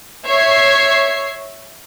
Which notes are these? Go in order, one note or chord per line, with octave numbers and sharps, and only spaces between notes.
C#5 E5 G#6 C7